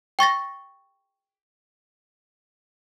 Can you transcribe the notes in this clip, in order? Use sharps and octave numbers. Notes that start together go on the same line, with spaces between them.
G5 C#6 A6 A#6